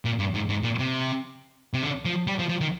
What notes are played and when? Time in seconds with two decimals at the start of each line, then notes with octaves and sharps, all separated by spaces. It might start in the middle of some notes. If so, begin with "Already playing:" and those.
0.05 A#2
0.19 G2
0.34 G#2
0.49 G#2
0.63 A#2
0.79 C3
1.74 C3
1.82 D3
2.05 F3
2.27 G3
2.39 F3
2.49 F3
2.61 D#3